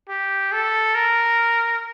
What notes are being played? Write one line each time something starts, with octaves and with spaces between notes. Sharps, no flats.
G4
A4
A#4